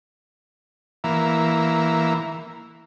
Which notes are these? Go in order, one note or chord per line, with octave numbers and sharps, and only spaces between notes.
E3 A#3